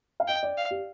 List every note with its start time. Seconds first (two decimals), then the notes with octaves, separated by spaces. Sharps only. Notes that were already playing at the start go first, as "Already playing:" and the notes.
0.20 F5
0.28 D#5 G5
0.43 D5
0.57 F5
0.71 G4